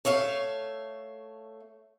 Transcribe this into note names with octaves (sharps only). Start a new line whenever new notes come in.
A3 C#5 E5 F5